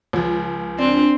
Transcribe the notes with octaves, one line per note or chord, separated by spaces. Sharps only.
C#2 F3
C4 D4